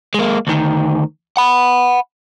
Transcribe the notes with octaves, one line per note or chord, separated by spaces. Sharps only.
G#3 A#3
D2 D#3
F#5 B5